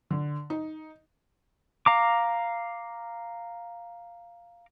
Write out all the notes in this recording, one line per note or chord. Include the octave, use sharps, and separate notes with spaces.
D3
D#4
F5 A#5 D6